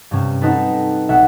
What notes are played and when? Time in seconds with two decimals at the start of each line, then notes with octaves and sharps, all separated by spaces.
0.11 G2 C3 C4 C#4
0.42 C4 D#4 F#4 A4 B4
1.09 B1 E5 F#5